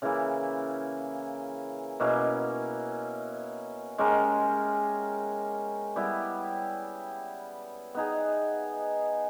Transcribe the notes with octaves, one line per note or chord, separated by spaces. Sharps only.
C#3 E3 A#3 E4
B2 A#3 C#4 E4
G#3 C#4 G4 A#4
G3 B3 E4 G4
B3 D#4 G#4